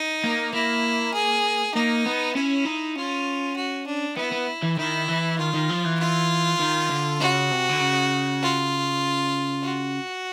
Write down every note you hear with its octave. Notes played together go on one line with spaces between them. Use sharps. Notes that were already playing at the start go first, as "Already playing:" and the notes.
Already playing: D#4
A#3
A#3 E4
G#4
A#3 D#4
B3
C#4 E4
D#4
C#4 F4
F#4
D4
B3 E4
B3
E3
D#3 E4
E3
D#3 F4
D#3
F3
E3
F4
D#3
D3
C#3 F#4
C3
D3
C#3
F4
F#4